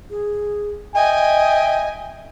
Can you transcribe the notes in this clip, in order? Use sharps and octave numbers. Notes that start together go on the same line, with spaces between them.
G#4
D#5 E5 G5 G#5